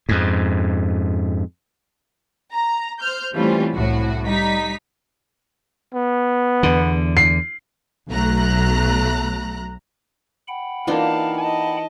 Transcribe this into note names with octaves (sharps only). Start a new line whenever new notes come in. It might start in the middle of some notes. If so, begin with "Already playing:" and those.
F2 G#2
A#5
C5 F6 G6
E3 G3 A3 C4 C#4 F4
C2 A2 F#4
G3 D#4 B6
B3
E2 D3
C7
B1 F#3 A3 A#5 F#6
F#5 G5 B5
E3 A#3 D4 D#4 F4 F5 A5
D#5 A5